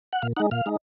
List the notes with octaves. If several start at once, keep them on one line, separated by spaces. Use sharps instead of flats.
F#5
A#2 F5
G#3 D#4 F#5
A#2 F5
G#3 D#4